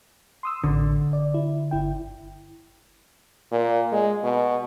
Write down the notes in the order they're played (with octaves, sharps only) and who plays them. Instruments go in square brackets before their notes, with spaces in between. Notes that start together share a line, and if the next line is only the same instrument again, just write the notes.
[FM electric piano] C6 D#6 E6
[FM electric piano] A1 [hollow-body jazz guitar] D3
[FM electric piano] D5
E4
G1 E4 G5
[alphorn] A#2
G#3
B2